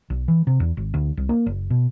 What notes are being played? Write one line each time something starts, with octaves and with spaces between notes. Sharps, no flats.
B1
E3
C3
E2
G#1
D2
C2
A#3
F#1
B2